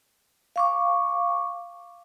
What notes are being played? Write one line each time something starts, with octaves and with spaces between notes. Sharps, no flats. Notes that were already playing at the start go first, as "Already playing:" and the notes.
F5 C#6 D6